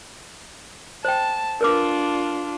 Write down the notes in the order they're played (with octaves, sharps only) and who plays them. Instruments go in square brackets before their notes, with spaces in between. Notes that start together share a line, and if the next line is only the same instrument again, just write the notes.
[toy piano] C5 G5 [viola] A5
[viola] D4 F4 [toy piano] A#4 B4 D6